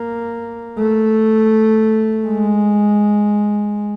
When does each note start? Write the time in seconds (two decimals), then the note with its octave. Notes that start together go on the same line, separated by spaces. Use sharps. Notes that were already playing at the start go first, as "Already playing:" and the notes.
Already playing: A#3
0.78 A3
2.27 G#3